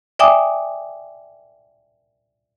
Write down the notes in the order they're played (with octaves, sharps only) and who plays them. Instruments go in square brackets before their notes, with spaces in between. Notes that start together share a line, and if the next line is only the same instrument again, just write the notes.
[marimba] D5 E5 G5 G#5 D6 D#6